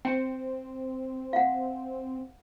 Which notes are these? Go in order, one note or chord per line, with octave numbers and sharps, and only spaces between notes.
C4 G5
F5 F#5